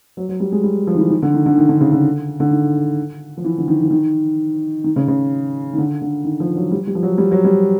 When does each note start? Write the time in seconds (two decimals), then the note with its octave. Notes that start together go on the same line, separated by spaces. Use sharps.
0.17 F#3
0.29 F#3
0.40 G3
0.52 G#3
0.63 G3
0.87 F3
0.95 D#3
0.99 E3
1.10 D#3
1.22 D3
1.34 D#3
1.46 D3
1.57 D#3
1.69 D3
1.81 C#3
1.92 D3
2.40 D3
2.51 D#3
3.37 F3
3.44 E3
3.58 D3
3.68 D#3
3.84 E3
3.91 D#3
4.84 D#3
4.96 C#3
5.08 C#3
5.73 D#3
5.78 D3
6.02 D3
6.25 D#3
6.40 F3
6.56 F#3
6.71 G3
6.87 G3
6.95 F3
7.03 F#3
7.18 G3
7.31 F#3
7.45 G3